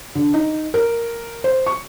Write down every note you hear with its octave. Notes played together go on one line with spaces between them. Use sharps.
D3
D#4
A#4
C5
C#6